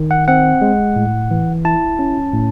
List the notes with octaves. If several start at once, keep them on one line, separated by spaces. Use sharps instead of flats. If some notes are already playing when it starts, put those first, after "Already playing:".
Already playing: D#3
F#5
C4 F#5
G#3
A2
E3
E4 A5
C#4
A2